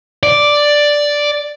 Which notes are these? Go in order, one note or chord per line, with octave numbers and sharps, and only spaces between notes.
D5